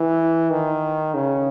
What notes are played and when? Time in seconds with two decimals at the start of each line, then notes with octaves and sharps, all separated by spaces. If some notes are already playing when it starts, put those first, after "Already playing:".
Already playing: E3
0.51 D#3
1.14 C#3